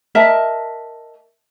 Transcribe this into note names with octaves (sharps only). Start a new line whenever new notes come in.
A#4 D#5 E5 A5